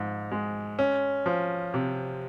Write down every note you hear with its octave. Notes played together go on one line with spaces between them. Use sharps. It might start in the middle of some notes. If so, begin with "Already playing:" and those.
Already playing: G#2 F3
G#3
C#4
F3
C3